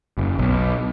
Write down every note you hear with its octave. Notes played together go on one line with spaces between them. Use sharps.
F#1
B1